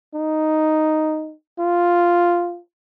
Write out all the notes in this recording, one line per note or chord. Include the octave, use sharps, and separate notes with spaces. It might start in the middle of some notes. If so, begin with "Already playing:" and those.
D#4
F4